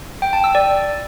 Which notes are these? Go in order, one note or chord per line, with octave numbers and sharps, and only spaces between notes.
G5
A5
E6
D5